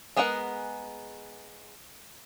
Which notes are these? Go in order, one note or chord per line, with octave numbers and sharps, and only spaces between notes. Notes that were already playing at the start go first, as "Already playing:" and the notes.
G#3 B3 G#4 A#4 F#5